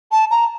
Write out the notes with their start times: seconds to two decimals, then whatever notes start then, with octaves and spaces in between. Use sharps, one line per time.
0.12 A5
0.31 A#5